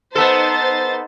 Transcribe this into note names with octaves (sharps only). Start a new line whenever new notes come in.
B3 D#4 A4 C5 A6